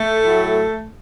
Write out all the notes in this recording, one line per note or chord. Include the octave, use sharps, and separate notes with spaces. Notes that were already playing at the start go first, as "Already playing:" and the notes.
Already playing: A3
A2 F#3